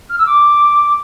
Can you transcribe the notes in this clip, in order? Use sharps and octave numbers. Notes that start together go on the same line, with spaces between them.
F6
E6
D6